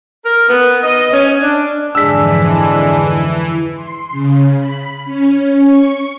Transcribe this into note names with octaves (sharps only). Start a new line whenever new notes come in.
A#4
B3
D#5
C#4
D4
F2 G#2 D3 E3 G#3 D4 E6 B6
C6
C#3
B5
C#4
C#6